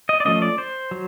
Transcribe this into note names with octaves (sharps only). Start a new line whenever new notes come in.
D#5
D5
F3 A3 C#4 D#5
D5
C5
F#3